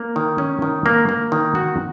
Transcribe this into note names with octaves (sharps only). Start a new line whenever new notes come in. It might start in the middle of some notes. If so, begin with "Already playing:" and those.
Already playing: A#3
D#3
C#4
D#3
A#3
A#3
D#3
F#4